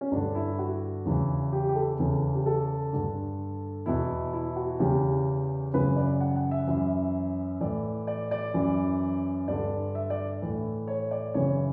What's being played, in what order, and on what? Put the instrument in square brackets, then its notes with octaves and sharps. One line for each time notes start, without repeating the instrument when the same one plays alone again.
[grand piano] C#4
G2 D3 D4
E4
F#4
E2 C#3 E3
G4
G4
A4
E2 C#3 E3
G4
A4
G2 D3
E2 B2 E4
E4
F#4
E2 C#3 E3 G4
F#2 C#3 E3 B4
D5
F#5
F#5
E5
F#2 E3
A2 E3 D5
D5
D5
F#2 E3
G2 D3 D5
E5
D5
A2 E3
C#5
D5
F#2 C#3 E3 C#5